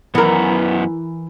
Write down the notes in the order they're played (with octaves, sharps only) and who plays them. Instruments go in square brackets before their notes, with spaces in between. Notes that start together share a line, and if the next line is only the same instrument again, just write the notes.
[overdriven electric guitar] F#2 B3 [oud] E3 A#4